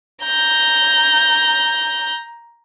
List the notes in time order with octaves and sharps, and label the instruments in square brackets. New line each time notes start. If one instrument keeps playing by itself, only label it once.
[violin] A#5 G6